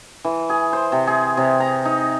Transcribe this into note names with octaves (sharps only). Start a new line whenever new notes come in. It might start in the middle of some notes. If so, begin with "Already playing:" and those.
E3
G#4
C5
C3
G#4
C3
A#5
D#4